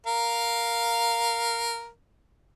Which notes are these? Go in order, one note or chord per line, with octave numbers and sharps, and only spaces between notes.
A#4 F5